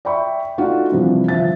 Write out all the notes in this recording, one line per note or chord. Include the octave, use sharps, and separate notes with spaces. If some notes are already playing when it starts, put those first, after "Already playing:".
D5 E5 G5 B5 C#6
A3 D4 D#4 F4 F#4
G2 C3 E3 F3
G1 F3 E5 A6